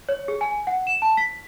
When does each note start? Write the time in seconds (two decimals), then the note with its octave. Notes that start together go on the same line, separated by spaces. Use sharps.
0.09 C#5
0.28 G#4
0.41 G#5
0.67 F#5
0.87 E7
1.02 A5
1.17 B6